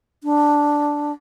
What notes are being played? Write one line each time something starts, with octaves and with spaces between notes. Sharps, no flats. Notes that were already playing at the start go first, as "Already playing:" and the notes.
D4